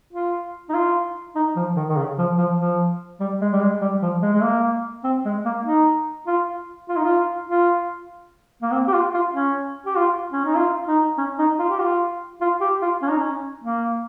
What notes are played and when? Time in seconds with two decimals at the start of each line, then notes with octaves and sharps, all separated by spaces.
0.13 F4
0.69 D#4
0.74 F4
1.36 D#4
1.56 F3
1.76 D#3
1.90 D#3
1.97 C#3
2.19 F3
2.38 F3
2.59 F3
3.20 G3
3.41 G#3
3.52 G3
3.61 G#3
3.81 G3
4.02 F3
4.22 G#3
4.33 G#3
4.42 A#3
5.04 C4
5.25 G#3
5.45 A#3
5.66 D#4
6.27 F4
6.89 F4
6.97 D#4
7.04 F4
7.50 F4
8.62 A#3
8.72 C4
8.88 G4
8.93 F4
9.14 F4
9.34 C#4
9.86 G4
9.96 F4
10.33 C#4
10.45 D#4
10.57 F4
10.88 D#4
11.18 C#4
11.39 D#4
11.59 F4
11.70 G4
11.79 F4
12.41 F4
12.61 G4
12.82 F4
13.02 C#4
13.10 D#4
13.19 C#4
13.64 A#3